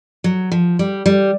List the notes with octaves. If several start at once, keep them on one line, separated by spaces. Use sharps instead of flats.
F#3
F3
G3
G3